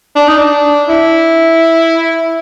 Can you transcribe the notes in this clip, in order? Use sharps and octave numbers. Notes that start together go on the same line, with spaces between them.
D4
D#4
D4
E4